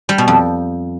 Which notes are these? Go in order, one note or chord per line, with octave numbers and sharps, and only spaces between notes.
G3
B2
F2